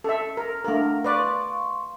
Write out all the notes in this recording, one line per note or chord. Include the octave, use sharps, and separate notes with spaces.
C#4 A4 E5
A#4
A3 D4 A#4 F5 F#5
B4 D5 F5 C6 C#6